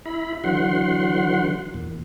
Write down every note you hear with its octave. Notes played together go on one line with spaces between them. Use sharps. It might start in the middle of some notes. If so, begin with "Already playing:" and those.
E4 B5
D3 E3 F#3 F#5 C6
E2 A#2